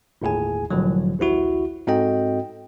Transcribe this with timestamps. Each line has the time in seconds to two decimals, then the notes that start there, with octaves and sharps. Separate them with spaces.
0.22 G1 D#2 A2 G#4 G#5
0.71 C2 A2 D3 F3 F#3
1.19 A1 D2 E4 F#4
1.87 G#2 C4 F#4 A4 D#5 G5